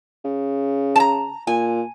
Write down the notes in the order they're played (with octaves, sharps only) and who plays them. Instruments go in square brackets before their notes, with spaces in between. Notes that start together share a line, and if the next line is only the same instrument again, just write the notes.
[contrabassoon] C#3
[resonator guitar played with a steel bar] A5 A#5
[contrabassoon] A#2 [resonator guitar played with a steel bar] G#5